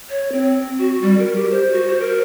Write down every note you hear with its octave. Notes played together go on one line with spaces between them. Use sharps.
C#5
C4
F#4
G3
A#4
G4
C5
F#4
C5
A#4